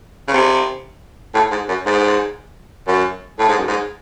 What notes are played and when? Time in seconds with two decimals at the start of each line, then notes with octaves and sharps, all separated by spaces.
0.28 C#3
0.33 C3
1.34 A2
1.51 G#2
1.69 F#2
1.86 G#2
2.88 F#2
3.39 A2
3.49 G#2
3.58 F#2
3.68 G#2